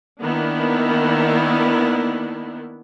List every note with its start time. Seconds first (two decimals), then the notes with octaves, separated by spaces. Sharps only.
0.21 D#3 A#3 B3 D4 E4